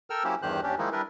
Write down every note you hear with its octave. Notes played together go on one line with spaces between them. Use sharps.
A4 A#4 G5 E6 F6
F#3 A#3 C#4 E4 G4 C5
E2 G2 D#3 G4 C5 F#6
D#2 C#4 D4 G4
D#3 F3 G#3 A#3 D#4 E4
G3 D4 E4 A#4 B4